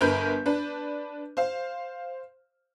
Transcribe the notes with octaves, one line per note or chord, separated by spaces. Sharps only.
G1 A#4 B4 G6
D4 B4
C5 F5